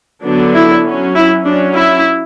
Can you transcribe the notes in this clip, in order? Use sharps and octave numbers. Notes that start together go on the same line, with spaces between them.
D3 F#3 B3 D4
E4
F#3 C#4
E4
F#3 C#4 D4
E4